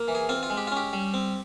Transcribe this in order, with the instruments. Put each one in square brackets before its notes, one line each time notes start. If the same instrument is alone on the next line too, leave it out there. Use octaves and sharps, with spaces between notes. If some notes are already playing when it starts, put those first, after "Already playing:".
Already playing: [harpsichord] A#3
E3
G#4
C4 F4
F4
G#3
G4
F4
C#4 G4
G3
C4